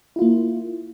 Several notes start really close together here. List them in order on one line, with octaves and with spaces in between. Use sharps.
E4 F4 A#3